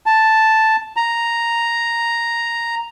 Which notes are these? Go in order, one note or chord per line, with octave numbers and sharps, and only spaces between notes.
A5
A#5